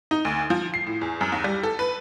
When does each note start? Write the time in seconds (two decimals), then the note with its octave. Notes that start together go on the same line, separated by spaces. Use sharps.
0.11 D#4
0.25 D2
0.50 F3
0.74 C7
0.87 A2
1.01 E2
1.21 F#2
1.32 D#2
1.44 G3
1.63 A4
1.79 B4